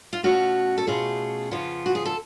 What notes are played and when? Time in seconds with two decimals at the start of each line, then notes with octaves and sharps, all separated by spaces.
0.13 F4
0.23 B2 A3 C#4 F4 F#4
0.78 A4
0.87 B2 A3 C#4 F4 G#4
1.51 F2 C#3 F3 B3 F4
1.86 F#4
1.95 G#4
2.05 A4